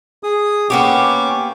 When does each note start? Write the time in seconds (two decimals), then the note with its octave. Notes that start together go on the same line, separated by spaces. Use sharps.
0.23 G#4 D#6
0.70 A#3 B3 C#4 G4 C#6 D6